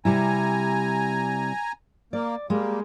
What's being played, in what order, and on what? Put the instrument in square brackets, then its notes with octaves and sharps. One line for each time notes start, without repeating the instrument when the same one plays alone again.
[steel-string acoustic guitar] C3 G3 E4 [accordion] G#5 A#5
[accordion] A#3 [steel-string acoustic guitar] D5
[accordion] G3 A#3 [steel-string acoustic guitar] G#3